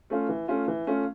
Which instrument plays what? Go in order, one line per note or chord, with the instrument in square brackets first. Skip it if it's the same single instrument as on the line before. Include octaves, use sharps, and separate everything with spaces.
[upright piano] A3 C#4 F4
E3
A3 C#4 F4
E3
A3 C#4 F4